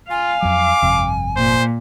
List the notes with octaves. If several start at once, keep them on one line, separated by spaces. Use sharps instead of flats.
F4 F5 G#5
F2 F#3 D6
G1 F2 C3
A#2 C5